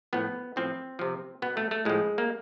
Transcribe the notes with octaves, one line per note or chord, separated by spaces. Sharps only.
A2 F3 B3
A2 F3 C4
C3 F3
B2 B3
A3
A3
A2 F3 G#3
A#3